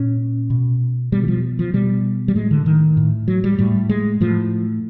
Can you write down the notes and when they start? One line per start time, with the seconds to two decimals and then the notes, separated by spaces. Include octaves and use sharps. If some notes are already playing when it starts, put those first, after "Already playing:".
Already playing: A#2 C#4
0.50 B2
1.12 B2 G3
1.23 E3
1.28 F3
1.59 F3
1.74 B2 G3
2.28 G3
2.35 A2 G#3
2.51 D3
2.66 D#3
2.97 A2
3.28 F#3
3.44 G3
3.59 A2 G3
3.89 G#3
4.21 A2 F3